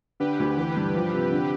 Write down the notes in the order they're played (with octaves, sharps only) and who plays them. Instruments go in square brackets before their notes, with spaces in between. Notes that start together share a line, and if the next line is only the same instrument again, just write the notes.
[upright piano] D3 [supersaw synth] G4 B4
[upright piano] D2
[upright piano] E3 [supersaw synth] G4
[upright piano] G2
F3
C3
D3